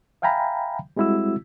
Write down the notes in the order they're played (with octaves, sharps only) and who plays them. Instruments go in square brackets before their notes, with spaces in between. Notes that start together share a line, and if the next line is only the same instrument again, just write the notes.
[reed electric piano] E5 F5 G5 G#5 A#5 B5
G3 G#3 C4 E4 F#4 E6